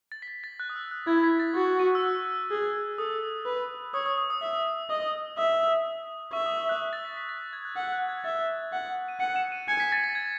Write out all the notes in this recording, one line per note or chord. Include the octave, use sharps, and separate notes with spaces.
A6
B6
A6
A6
F#6
D#6
E6
F#6
E4 G#6
B6
A6
F#4 G#6
D#7
E6
F#6
G#4
A4 D#6
B4
C#5 D#6
D#6
D#6
D#6
E5
D#5
E5 D#6
E5 C#6
D#6
E6
F#6
A6
B6
B6
A6
G#6
F#6
F#5 E6
F#6
G#6
E5 A6
F#5
D#7
F#5 C#7
E7
D#7
G#5 C#7
B6
A6
A6
G#6